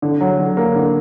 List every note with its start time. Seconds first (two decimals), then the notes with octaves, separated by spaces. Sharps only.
0.02 D3
0.20 F#3
0.39 D3
0.57 A#3
0.75 D3